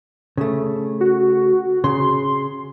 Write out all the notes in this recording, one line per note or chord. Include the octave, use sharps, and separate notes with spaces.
C#3 A3
F#4
C#3 C6